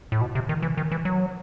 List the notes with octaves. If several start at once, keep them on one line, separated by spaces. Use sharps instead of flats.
A2
B2
C3
D#3
E3
D#3
E3
F#3